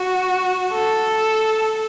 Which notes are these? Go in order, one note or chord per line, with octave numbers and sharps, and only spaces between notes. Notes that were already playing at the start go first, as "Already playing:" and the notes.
Already playing: F#4
A4